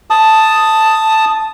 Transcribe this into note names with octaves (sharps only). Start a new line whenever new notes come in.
A5 D#6